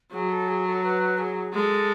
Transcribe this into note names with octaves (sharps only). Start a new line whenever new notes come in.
F#3 G#4
A4
G#4
A4
B4
G#4
G#3 A4